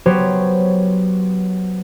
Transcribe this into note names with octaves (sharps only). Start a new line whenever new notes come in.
F#3 B3 G4 C5 C#5